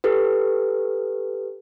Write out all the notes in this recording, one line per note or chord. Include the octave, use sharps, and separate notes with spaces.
G4 A4 B4